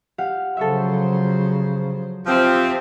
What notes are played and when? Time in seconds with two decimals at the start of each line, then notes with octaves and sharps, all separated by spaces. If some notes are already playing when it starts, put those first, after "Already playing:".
0.18 G4 F5 F#5
0.57 C#3 F3 F#3 A4 C5 C#5 E5
2.26 F3 C4 F4 G4 E5